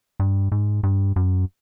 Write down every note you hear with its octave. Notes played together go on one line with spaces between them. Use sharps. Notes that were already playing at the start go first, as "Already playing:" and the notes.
G2
G#2
G2
F#2